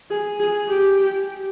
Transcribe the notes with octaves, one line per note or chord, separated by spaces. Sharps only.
G#4
G#4
G4